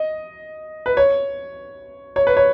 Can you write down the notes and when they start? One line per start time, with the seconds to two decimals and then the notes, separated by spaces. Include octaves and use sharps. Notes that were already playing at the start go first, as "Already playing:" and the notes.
Already playing: D#5
0.86 B4
0.97 C#5
2.16 C#5
2.27 B4
2.37 C#5